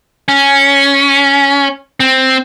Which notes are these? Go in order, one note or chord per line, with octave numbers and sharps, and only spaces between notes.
C#4
C4